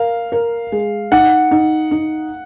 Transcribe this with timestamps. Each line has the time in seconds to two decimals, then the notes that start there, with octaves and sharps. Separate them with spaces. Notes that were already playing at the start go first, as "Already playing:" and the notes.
Already playing: A#4 F5
0.32 A#4
0.72 G#3
1.12 D#4 F#5
1.51 D#4
1.91 D#4